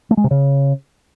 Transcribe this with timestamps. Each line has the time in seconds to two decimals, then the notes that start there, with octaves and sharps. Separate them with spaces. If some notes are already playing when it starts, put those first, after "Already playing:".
0.11 A3
0.17 G#3
0.24 C3
0.31 C#3